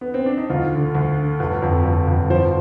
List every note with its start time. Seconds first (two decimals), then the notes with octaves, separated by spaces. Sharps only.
0.01 B3
0.14 C4
0.26 D4
0.37 D#4
0.50 D2 F4
0.73 D3
0.95 D2
1.17 D3
1.40 G1
1.62 F2
1.85 F2
2.08 G1
2.30 F3 C5